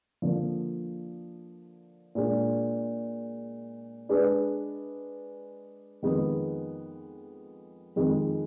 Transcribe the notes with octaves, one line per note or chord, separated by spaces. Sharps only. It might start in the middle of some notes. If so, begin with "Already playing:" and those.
D3 F3 A#3
A#2 G#3 D4
G#3 D4 G#4 B4 D5
F2 D#3 G#3 B3
F2 D#3 G#3